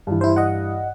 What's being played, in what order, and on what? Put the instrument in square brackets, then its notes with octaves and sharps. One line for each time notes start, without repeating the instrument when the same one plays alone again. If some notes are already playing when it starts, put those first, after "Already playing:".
[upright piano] G2 E3
[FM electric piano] E4 C5
D#5 F#5